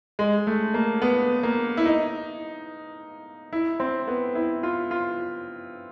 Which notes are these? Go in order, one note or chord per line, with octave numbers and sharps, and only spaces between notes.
G#3
A3
A#3
B3
A#3
E4
D#4
E4
C4
B3
E4
F4
F4